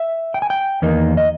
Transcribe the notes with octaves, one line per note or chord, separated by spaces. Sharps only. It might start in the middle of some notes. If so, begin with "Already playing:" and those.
Already playing: E5
G5
G#5
G5
E2 D#3 A#3 D#4
D#5